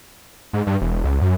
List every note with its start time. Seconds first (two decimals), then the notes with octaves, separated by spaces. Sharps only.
0.53 G#2
0.67 G2
0.81 E1
1.04 C#2
1.21 F#2